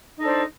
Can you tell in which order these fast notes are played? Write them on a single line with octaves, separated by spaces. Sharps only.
D#4 A4 D4 C5